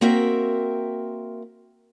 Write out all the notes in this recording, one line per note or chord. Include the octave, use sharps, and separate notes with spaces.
A#3 C4 F#4 A#4 E5